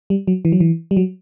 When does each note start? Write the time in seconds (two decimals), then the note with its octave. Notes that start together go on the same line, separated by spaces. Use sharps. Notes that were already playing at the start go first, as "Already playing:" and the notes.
0.10 G3
0.27 F#3
0.45 E3
0.52 F#3
0.60 E3
0.91 G3
0.97 F#3